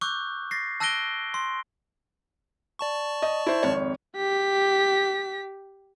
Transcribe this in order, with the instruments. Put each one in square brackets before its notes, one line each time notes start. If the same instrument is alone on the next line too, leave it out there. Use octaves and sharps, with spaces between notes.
[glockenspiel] C#6 D6 E6 F#6 G6
A6 A#6 C7
A5 E6 F#6 A#6 D7 G7
C6
[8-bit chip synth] D5 A5 C#6
[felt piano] D#5
E4 C5
G#1 F2 C#5
[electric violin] G4 B6